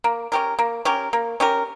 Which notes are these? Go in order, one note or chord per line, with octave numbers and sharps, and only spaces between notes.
A#3
C#4 G4 A#4
A#3
C#4 G4 A#4
A#3
C#4 G4 A#4